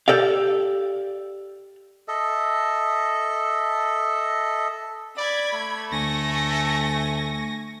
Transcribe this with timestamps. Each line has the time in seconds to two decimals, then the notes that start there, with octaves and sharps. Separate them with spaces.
0.08 G4 A4 D5 F5
2.08 A4 D#5 E5
5.17 D5 B5 G#6
5.53 A3
5.92 D2 G#5 C#6 A#6